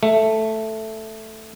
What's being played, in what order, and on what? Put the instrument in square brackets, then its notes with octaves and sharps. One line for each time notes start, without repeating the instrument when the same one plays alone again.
[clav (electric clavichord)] A3